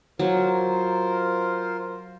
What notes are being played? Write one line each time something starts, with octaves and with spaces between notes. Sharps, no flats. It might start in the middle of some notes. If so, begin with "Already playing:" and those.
F#3 F4 A#4 C5